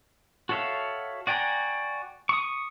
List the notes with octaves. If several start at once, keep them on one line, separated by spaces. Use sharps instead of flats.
F#4 A4 C#5 E5 F5
F#4 D5 G5 G#5 A#5
C#6 D#6